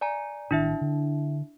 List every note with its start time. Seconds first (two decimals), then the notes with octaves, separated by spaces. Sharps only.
0.01 D5 G#5 A#5
0.51 A1 D#3 D4 E4 E5
0.81 D3